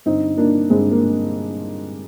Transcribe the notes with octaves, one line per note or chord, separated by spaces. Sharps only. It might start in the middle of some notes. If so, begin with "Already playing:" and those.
G2 D3 C4 D#4
A#3 D4
G2 D3 G#3 C4
A#3